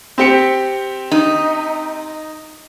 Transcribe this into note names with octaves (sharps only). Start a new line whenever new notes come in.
C4 G4 C#7
D#4